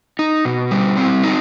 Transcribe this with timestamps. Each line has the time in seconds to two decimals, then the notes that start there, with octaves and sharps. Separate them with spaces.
0.19 D#4
0.45 B2
0.71 G3
0.97 C4
1.23 D#4